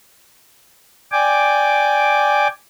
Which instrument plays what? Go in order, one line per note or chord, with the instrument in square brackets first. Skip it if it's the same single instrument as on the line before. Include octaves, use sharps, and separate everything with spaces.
[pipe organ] D5 G5 G#5 D6